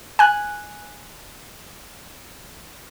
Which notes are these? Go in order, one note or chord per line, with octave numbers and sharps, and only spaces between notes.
G#5 F#6